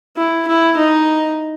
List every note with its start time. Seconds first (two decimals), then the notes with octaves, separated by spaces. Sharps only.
0.17 E4
0.47 E4
0.77 D#4